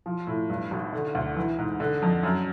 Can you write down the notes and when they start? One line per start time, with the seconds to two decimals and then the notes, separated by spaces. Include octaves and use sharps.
0.06 F3
0.27 A2
0.50 G2
0.71 G#1
0.93 D3
1.15 D2
1.37 E3
1.58 G#2
1.80 D3
2.02 F2
2.23 F#2